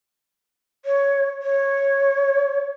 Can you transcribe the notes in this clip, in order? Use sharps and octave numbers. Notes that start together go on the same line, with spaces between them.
C#5
C#5